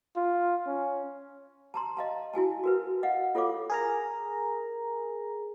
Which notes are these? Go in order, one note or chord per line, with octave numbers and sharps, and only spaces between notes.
F4
C#4
A5 A#5 C6
D#5 F5 A5
E4 F#4 G#5 A5
F#4 A#4 B4
D#5 F5 F#5
F4 A4 C#5 F5 D6
G#4 A#4 A#5